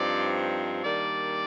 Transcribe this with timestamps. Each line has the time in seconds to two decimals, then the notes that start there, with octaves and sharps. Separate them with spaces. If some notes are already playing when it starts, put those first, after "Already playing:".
Already playing: G2 F3 C4 D#4 D5
0.84 D#3 G3 A#3 D4 D5